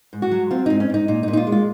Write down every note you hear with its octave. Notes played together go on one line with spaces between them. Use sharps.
G#2
F#4
F#3
C4 F4
G#2 D#4
C#4
G#2 D#4
A#2 D#4
D#4
A#2
D#4
F4
G#3
F4